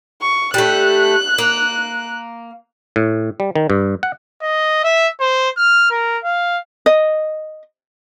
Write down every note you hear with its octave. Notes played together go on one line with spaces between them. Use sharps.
C#6
G3 A3 F#6
A#3
A2
G3
D#3
G2
F#5
D#5
E5
C5
F6
A#4
F5
D#5